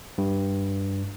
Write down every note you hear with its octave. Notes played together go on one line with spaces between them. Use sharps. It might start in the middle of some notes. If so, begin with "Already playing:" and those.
G2